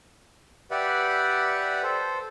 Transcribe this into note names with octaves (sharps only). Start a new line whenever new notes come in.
G4 B4 D5 E5 F#5
A4 C5